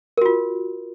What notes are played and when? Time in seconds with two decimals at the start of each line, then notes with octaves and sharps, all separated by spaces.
0.17 A#4
0.22 F#4
0.26 F4